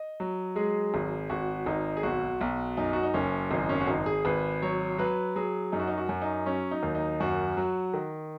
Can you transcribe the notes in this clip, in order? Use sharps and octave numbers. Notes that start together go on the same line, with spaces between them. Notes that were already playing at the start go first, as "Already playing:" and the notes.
Already playing: D#5
F#3
G#3 G#4
G#1
G#1 F#4
G#1 D#4
G#4
B1 F#4
B1
F#2 D#4
F#4
D#4
F#1 C#4
G#1 D#4
C#4
F#4
G#1 D#4
G#4
G#1 B4
F#3 C#5
F#3 B4
F#3 G#4
F#2 D#4
F#4
D#4
F#4
F#2
D#4
F#3 C#4
D#4
D#2
D#4
F#2 F#4
F#3
D#3